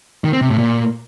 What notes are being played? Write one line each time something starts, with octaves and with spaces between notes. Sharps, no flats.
D#3
C4
C3
A2
A#2